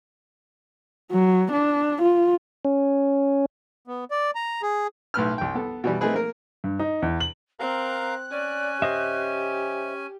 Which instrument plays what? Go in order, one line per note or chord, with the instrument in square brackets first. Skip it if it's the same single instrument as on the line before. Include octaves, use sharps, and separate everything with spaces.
[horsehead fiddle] F#3
D4
F4
[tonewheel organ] C#4
[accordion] B3
D5
A#5
G#4
[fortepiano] B1 A2 B4 F6
C2 G5
B3 A4
B2 E3 G3
A3 A#3 C4 D#4 G#4 B4
A#3 A#4
[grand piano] G2
D#4
E2
F#7
[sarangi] C4 [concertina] A#4 F5 A#5 [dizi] F#6
[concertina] C#4 G#5 [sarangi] D5
[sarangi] G4 [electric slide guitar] C5 D#5 E5